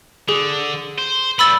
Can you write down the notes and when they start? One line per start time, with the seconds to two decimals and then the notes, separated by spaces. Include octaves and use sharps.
0.29 D3 G#4
0.98 C5
1.39 G3 B3 B5 E6 A6